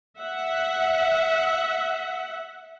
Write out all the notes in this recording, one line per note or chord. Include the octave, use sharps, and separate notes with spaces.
E5 F#5